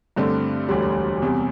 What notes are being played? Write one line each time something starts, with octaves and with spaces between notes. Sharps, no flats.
G2 D3 A3 C4
E1 D2 D3 G3
E2 C3 G3